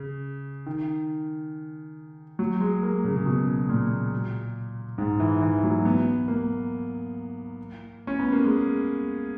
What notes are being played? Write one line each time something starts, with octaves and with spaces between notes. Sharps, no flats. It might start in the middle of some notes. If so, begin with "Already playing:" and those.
Already playing: C#3
D#3
F#3
G#3
A#3
C#3
C#3
B2
A#2
G#2
E3
E3
F#3
B3
A#3
C#4
B3
A#3
G#3